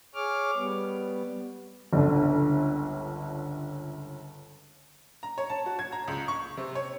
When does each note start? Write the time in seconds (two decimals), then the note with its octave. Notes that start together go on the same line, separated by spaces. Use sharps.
0.15 G#4 C#5 D6 F6
0.56 G3 B3
1.93 G1 C#2 D3
5.23 A#5
5.38 C#5
5.50 A5
5.66 F#4
5.79 G#6
5.92 A#5
6.08 C#2
6.28 C#6
6.57 C3
6.75 C#5